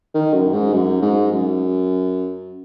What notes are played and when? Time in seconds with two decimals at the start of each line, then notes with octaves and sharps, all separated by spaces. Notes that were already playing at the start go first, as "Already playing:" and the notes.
0.14 D#3
0.34 F#2
0.54 G#2
0.73 F#2
1.02 G#2
1.31 F#2